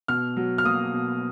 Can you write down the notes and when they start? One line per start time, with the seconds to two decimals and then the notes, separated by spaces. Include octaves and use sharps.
0.08 B2 F6
0.37 F#3
0.58 F6
0.64 A#3 D#6
0.93 B2